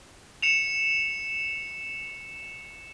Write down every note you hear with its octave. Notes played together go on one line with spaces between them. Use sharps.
C#7 E7 F7